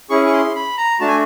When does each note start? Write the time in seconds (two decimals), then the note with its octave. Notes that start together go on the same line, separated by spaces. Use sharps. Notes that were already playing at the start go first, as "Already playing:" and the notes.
0.10 C#4 E4 G#4 C#6
0.27 C#6
0.32 C6
0.55 B5
0.78 A#5
1.00 A3 D4 F#4 A5
1.08 G#5